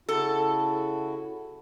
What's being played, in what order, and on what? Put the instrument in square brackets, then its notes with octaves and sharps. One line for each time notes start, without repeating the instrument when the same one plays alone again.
[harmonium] C#3 E4 F#4 [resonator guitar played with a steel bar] A4